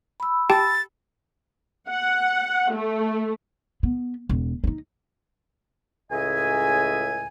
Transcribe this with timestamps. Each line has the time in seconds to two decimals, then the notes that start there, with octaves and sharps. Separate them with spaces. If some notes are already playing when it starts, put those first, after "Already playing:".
0.20 B5 E6
0.50 G4 G5 A5 A6
1.89 F#5
2.73 A3
3.83 B3
4.29 E1
4.64 D4 D#4
6.11 C#2 A2 C#3 D#5 E5 G#5